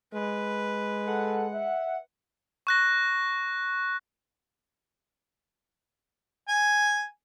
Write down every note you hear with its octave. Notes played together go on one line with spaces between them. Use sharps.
G#3 B4
A4 F#5
E5
C#6 F#6 A#6
G#5